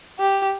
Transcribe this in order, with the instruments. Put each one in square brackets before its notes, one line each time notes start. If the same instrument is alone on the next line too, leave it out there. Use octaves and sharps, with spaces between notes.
[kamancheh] G4